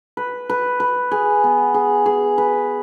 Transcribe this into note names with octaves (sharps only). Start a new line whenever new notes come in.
B4
B4
B4
G#4
B3
G#4
G#4
B4